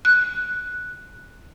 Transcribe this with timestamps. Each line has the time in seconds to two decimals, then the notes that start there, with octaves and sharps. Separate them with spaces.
0.05 F#6